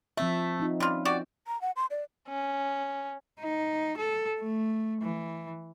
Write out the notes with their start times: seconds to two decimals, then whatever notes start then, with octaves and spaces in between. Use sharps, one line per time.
0.17 F3 A3 C4 E5
0.60 C4 D#4 F4
0.80 G3 C#4 F4
1.05 F#4 G4 D5
1.47 A#5
1.62 F#5
1.76 C6
1.91 D5
2.28 C#4
3.41 D#4
3.97 A4
4.40 A3
5.02 E3